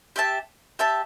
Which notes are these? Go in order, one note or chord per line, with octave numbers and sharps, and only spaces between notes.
G4 E5 A5
G4 E5 A5